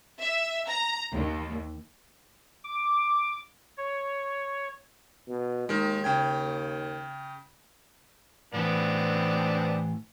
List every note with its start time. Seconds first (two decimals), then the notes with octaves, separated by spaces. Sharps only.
0.21 E5
0.67 A#5
1.12 D#2
2.64 D6
3.77 C#5
5.28 B2
5.69 D#2 D#3 G#3
6.04 C#3 G5 G#6
8.54 A2 E3 B3 C4 D4